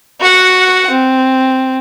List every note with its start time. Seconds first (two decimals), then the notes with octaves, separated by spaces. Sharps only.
0.20 F#4 F#5
0.90 C4